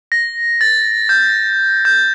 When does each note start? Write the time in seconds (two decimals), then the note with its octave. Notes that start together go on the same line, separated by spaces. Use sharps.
0.12 A#6
0.61 A6
1.09 G6
1.85 G6